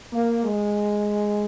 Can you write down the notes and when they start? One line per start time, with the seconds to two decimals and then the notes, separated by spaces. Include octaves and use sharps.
0.13 A#3
0.44 G#3